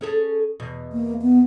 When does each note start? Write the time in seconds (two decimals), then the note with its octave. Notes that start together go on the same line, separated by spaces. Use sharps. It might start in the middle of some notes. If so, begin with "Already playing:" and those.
0.01 C#4 G#4 A4
0.60 E2 B2
0.93 A#3
1.22 B3